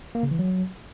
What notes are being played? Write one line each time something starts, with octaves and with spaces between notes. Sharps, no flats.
A#3
C#3
E3
F#3